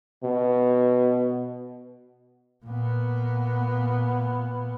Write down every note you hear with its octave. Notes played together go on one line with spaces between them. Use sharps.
B2
A#2 B3